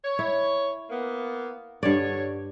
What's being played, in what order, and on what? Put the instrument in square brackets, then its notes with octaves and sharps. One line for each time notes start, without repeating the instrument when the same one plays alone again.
[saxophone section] C#5
[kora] E4
[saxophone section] A#3 B3
[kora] G2 D5 [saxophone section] D3 C#5